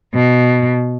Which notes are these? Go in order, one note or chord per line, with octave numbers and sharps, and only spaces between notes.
B2